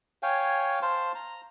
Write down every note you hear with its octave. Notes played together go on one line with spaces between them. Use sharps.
C#5 F5 G5 G#5
C5 F5 A5 C6
A#5